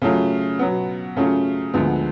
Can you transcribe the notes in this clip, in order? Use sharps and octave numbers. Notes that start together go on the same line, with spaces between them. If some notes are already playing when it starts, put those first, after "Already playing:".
C#3 F#3 A3 F4
B2 F#3 B3
C#3 F#3 A3 C#4 F4
D2 D3 F3 G#3 B3